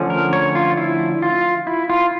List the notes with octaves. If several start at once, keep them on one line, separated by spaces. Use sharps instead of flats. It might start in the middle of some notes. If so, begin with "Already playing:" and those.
Already playing: D3 F3 A3 C#4
A#4
C#5
F4
E4
F4
E4
F4